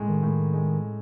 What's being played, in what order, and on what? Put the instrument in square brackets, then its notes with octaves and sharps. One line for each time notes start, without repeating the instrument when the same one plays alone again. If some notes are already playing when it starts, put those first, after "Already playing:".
Already playing: [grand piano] A2 G#3
[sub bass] D#3
[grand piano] A2
G#3